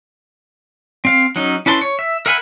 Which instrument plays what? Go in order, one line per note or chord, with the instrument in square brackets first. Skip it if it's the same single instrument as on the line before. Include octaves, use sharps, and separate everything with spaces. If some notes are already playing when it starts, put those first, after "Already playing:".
[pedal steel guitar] C4 F5
F#3 C#4 D#4
C#4 E4 B4 A5 C6
C#5
E5
A#4 E5 F#5 G#5 B5